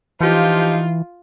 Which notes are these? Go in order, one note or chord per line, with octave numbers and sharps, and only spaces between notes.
E3 F3 D#4 F4 G4